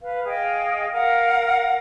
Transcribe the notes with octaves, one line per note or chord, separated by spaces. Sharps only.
B4 F5
G#4 D#5 F5 G5
A#4 F5 F#5